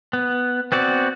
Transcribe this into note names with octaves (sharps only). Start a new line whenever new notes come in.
B3
B3 C4 F#4 D5